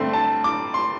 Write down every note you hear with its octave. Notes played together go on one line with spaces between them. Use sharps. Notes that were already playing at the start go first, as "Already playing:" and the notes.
Already playing: G2 D3 A3 C4 C6
A5
D6
C6